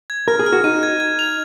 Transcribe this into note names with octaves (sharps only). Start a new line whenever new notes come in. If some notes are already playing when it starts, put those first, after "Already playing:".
G#6
A#4 F6
G#4
F6
F#4
D#4 D#7
G#6
G#6
F7